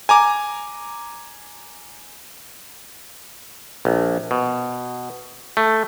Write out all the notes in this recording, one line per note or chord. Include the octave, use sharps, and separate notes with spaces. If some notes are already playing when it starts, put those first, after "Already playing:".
G#5 A#5 D6
A#1
B2
A3